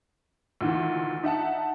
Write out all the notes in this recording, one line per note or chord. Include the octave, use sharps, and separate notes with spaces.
D2 A#2 D#3 E3
D#4 E5 F#5 A5